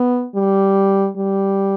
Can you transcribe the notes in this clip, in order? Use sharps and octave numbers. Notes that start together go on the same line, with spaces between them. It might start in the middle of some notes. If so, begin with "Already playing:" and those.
Already playing: B3
G3
G3